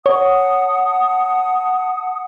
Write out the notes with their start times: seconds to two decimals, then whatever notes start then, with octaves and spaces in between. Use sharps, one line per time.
0.06 C#5 F#5 A5 D#6